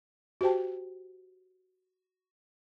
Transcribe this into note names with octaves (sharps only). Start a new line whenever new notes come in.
F#4 G4 C5 G5 A5